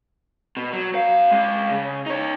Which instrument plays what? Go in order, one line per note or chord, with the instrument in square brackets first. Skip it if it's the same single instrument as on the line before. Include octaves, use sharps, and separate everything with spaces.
[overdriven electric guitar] B2
F#3
F#2 F5
G#3 F5
C#3
D#4 C#5